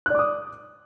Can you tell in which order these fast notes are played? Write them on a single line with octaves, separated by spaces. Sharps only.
F#6 D5 D6 D#6